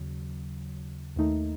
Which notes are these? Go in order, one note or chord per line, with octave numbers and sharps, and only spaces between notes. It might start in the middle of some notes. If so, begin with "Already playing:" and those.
Already playing: D#2 C#3 F#3
D#2 D#3 A3 D#4